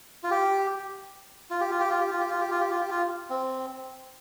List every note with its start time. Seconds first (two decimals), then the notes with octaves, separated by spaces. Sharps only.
0.23 F4
0.31 G4
1.51 F4
1.61 G4
1.70 F4
1.80 G4
1.90 F4
2.00 G4
2.11 F4
2.20 G4
2.30 F4
2.40 G4
2.51 F4
2.61 G4
2.71 F4
2.80 G4
2.91 F4
3.30 C4